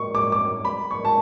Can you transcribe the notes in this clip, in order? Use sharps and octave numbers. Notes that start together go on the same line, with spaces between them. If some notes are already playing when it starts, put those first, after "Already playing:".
Already playing: C#6
D6
D6
B5
C#6
A5